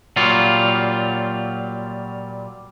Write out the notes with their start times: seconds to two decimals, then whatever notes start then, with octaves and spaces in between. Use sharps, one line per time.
0.16 A#2 F#3 G3 F4